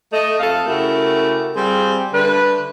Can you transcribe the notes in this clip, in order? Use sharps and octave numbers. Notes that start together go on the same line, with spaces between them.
A3 D#5
F2 A4 F5
C#3 A3 E4 F#4 G4 A#4
G3 C4 F4 G4 G#4
D3 G3 A3 B4